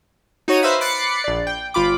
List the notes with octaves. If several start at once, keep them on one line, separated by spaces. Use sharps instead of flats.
D#4 F#4 C#5 D#7
B4 C5 E5 F5 B5
B5 D6 F#6 A6 C7 C#7
A#1 D5
G5
G1 F4 B5 D6